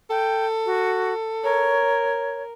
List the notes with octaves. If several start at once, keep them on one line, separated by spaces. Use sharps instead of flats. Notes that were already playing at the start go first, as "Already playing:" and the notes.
A4 G5
F#4
A#4 C#5